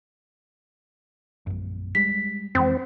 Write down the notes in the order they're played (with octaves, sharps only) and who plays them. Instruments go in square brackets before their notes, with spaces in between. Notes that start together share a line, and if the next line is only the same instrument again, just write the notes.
[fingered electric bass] A#1 F#2
[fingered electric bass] G3 G#3 [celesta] B6
[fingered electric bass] F2 E3 G#3 [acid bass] C4